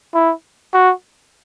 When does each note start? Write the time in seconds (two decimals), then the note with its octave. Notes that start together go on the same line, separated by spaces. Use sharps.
0.14 E4
0.74 F#4